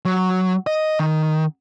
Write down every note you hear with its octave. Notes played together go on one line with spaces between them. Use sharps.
F#3
D#5
D#3